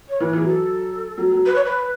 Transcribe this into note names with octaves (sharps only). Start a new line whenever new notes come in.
C#5
E3 B4
E3 G#4
F#3
A4
F#3
F#3
B4
C#5
B4